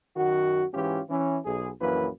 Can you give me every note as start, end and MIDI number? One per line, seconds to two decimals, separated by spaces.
0.16 0.63 42
0.16 0.63 51
0.16 0.63 66
0.74 1.01 44
0.74 1.01 52
0.74 1.01 61
0.74 1.01 65
0.74 1.01 67
1.09 1.38 52
1.09 1.38 61
1.44 1.69 35
1.44 1.69 68
1.80 2.07 34
1.80 2.07 42
1.80 2.07 52
1.80 2.07 58
1.80 2.07 71